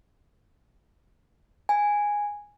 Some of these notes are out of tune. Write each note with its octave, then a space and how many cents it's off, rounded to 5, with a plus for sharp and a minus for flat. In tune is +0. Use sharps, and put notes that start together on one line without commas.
G#5 -5